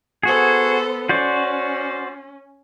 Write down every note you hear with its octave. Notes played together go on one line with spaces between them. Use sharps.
B3 F#4 G#4 A4 C5
C#4 F#4 C5 D5